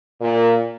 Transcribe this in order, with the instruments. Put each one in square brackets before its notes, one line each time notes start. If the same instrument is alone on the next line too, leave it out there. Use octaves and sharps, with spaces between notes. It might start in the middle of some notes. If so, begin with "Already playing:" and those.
[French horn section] A#2